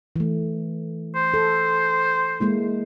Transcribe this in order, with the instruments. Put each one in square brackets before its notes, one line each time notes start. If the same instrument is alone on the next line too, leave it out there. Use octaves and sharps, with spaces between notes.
[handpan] E3 A3
[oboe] C5
[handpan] A4
G#3 A#3 E4